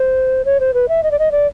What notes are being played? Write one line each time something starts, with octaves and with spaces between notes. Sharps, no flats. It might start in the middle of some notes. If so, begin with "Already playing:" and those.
Already playing: C5
C#5
C5
B4
E5
D#5
D5
D#5
D5